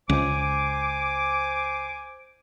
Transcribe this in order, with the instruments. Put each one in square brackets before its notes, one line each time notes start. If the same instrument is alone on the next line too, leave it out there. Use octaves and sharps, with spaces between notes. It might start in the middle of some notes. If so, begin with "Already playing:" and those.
[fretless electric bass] C#2 [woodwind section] C5 G#5 D6